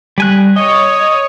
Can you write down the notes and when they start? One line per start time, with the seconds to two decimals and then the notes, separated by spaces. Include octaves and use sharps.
0.18 G3 G#5 F#6
0.56 C#5 D#5 D#6